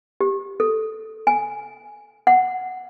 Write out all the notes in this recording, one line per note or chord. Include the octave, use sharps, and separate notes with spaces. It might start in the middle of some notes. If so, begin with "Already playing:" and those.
G4
A4
G#5
F#5